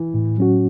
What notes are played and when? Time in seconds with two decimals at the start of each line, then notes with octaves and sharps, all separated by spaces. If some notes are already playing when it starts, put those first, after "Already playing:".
Already playing: E3
0.14 A2
0.38 F#3 C#4 F#4